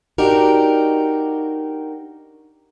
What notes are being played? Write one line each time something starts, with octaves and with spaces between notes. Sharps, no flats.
D4 D#4 F#4 G4 A#4